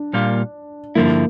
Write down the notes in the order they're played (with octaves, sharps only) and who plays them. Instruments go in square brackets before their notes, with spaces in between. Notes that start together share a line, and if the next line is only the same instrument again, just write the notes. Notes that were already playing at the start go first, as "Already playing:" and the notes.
Already playing: [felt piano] D4
[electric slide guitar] A#2 G3 A#3 F4
[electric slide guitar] G2 D3 F3 E4 [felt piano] A#3